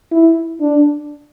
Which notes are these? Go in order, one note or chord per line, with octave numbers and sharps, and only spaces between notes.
E4
D4